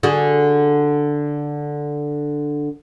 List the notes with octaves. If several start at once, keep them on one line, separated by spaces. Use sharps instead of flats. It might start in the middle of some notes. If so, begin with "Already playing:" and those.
D3 F#4 G#4